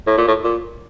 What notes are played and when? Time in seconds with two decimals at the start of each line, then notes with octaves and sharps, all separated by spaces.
0.07 A2
0.17 A#2
0.27 A2
0.44 A#2